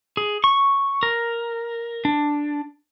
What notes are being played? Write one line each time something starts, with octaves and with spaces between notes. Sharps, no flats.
G#4
C#6
A#4
D4